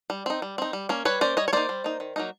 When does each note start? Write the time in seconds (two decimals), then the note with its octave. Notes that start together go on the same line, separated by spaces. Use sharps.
0.10 G3
0.26 C4 D#4
0.42 G3
0.58 C4 D#4
0.73 G3
0.89 A#3 C#4
1.05 G3 B4 C#5
1.21 A#3 C#4 C5 D5
1.37 G3 C#5 D#5
1.48 C#5
1.53 A#3 D#4 C5 D5
1.69 G3
1.84 A#3 D#4
2.00 D#3
2.16 F#3 A#3 D#4